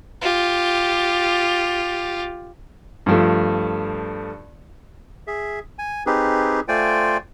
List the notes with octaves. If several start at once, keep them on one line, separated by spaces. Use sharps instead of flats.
F4 G4
G2 F3 A3
G#4 E5
G#5
C4 D#4 G4 G#4 B4
A3 F4 C5 D5 G5 G#5